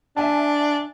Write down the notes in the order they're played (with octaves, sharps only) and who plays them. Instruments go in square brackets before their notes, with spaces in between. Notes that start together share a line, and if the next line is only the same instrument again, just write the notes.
[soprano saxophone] D4 [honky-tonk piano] E5 G#5 A5